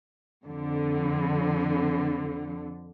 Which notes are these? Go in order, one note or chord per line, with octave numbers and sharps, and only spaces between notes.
F2 D3